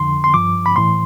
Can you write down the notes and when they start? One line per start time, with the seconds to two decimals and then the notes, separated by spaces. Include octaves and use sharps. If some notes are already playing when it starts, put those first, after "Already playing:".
Already playing: F2 D3 F3 C6
0.24 C6
0.34 G2 F3 D6
0.66 B5
0.76 A2 E3 C6